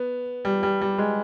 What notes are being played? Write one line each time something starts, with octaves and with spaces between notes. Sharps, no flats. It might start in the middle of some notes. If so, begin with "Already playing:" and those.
Already playing: B3
G3
G3
G3
G#3